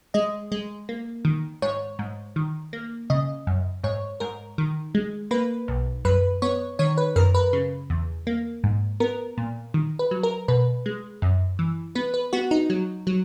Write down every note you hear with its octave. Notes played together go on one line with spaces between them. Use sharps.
G#3 D#5
G#3
A#3
D#3
G#2 C#5
G#2
D#3
A#3
C#3 D#5
F#2
G#2 C#5
G#2 A#4
D#3
G#3
A#3 B4
B1
F#2 B4
B3 C#5
D#3 C#5
B4
F#2 A#4
B4
C#3
E2
A#3
G#2
B3 A#4
A#2
D#3
B4
F#3
A#4
B2 B4
G#3
F#2
E3
B3 B4
B4
B3 F#4
D#4
F#3
F#3